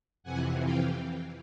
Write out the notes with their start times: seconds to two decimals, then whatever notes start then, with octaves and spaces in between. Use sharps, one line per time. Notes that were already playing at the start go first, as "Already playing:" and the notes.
0.23 F2 C3 E3 F#5 G#5
0.62 F5 G5